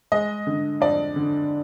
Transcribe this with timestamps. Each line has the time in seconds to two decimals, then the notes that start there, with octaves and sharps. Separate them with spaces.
0.12 G#3 D#5
0.47 D3
0.81 F2 D5
1.16 D3